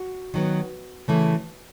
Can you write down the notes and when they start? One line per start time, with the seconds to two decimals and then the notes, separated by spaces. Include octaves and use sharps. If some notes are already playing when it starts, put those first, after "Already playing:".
Already playing: F#4
0.34 D#3 F#3 B3
1.08 C#3 E3 A3